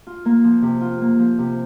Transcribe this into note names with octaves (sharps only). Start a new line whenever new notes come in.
F4
A#3
F3
C3
F4
A#3
F3
C3